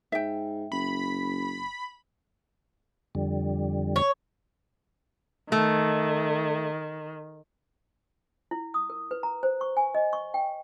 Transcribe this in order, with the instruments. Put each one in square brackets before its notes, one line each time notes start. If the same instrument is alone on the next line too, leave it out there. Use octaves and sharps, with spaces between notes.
[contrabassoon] G#2 [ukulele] E5 G5
[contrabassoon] F#1 [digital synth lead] B5
[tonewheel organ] F2 D3 G3
[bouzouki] C#5
[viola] D#3 [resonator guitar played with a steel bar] A3
[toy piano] E4
D#6
A#4
B4
A#5
C5
C#6
G#5
D#5
C#6
G5